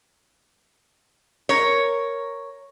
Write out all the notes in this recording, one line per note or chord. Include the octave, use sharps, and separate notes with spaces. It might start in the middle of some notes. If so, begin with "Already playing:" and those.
A#4 C#5